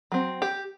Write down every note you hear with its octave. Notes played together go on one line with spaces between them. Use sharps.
F#3 C4
G4